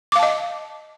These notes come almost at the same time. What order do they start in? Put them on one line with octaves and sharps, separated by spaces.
D6 F5 A5 D#5